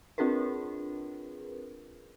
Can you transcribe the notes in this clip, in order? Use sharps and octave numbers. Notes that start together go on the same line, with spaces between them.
C4 D4 F4 G#4 A#4 B4